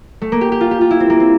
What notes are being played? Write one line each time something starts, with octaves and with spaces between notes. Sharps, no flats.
A3
A#3
G4
G4
F4
G4
F4
E4
C4
A#3
C4